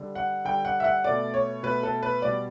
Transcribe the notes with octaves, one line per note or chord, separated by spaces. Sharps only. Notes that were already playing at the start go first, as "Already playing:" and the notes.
Already playing: D3 G3
F#5
D3 G3 G5
F#5
E5
F#5
B2 A3 D5
C#5
B2 A3 B4
A4
B4
B2 G3 D5